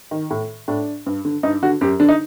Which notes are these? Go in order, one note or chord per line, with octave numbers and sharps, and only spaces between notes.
D#3
A2
A2 D4
G2
D3
G2 D#4
D3 F#4
F#2 G4
D3 D4
D#4